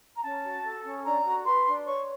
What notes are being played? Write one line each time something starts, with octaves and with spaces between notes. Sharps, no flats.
A#5
C#4 A5
F#4
A4
C#4
D4 A#5
F#4
B4 C6
D4
C#5 C#6